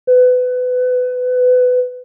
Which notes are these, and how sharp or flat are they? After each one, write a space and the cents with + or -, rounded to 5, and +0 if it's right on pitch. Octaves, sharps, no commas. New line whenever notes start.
B4 +25